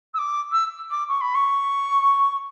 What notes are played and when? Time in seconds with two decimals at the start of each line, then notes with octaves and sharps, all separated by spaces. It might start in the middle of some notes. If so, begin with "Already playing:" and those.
0.14 E6
0.18 D6
0.51 E6
0.90 D6
1.08 C#6
1.20 B5
1.34 C#6